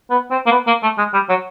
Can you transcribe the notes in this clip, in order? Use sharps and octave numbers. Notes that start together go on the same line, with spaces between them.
B3
C4
A#3
B3
A#3
A3
G#3
G3
F#3